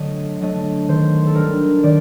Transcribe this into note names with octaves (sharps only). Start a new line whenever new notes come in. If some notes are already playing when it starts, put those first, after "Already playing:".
Already playing: D3 F#3 A3 D#5
F#3 A3 D4 D#5
D#3 C5
A4
G3 D4 A#4
D#3 D5